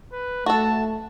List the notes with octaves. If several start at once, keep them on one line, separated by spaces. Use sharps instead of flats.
B4
A3 F#4 A4 A5